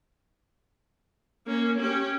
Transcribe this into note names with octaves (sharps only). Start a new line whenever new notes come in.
A#3 C#4
C#4 G4